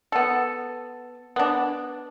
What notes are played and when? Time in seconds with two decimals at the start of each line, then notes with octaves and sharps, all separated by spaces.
0.12 B3 A4
1.36 B3 D4